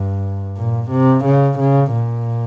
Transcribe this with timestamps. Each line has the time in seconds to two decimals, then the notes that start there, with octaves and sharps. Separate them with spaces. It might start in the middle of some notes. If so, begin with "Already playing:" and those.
Already playing: G2
0.57 A#2
0.91 C3
1.25 C#3
1.59 C#3
1.93 A#2